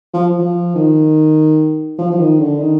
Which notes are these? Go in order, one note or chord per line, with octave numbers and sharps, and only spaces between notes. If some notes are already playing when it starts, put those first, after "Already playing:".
F3
F3
D#3
F3
F3
D#3
D3
D#3